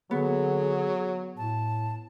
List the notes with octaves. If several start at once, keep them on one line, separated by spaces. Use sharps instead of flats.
D3 F#3 B3 G#4
A2 A5